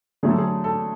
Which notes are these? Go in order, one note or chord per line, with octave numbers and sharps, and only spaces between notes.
D3 F#3 A3 G#4
A4
G#4
A4